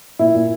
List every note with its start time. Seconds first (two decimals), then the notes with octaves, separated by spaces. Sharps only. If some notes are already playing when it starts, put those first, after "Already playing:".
0.19 A#2 E4
0.35 A#2